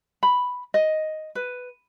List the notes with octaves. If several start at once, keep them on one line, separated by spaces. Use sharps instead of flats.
B5
D#5
B4